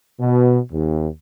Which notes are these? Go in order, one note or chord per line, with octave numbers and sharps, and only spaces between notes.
B2
D#2